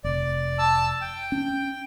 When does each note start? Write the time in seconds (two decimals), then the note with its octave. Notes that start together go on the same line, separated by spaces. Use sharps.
0.04 F1 D5
0.58 A5 E6
1.01 G5
1.32 C#4